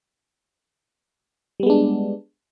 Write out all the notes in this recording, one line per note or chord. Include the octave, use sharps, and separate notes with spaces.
G3 G#3 B3 D4